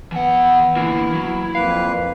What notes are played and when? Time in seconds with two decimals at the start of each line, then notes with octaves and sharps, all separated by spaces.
0.12 E3 B3 F#5
0.77 D3 E3 A#3 E4
1.14 F#3
1.55 F2 A#3 B4 F5